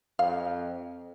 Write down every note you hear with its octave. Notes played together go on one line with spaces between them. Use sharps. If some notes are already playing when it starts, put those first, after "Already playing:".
F2 F5